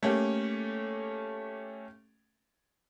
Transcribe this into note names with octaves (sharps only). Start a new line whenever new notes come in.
A3 A#3 C#4 G4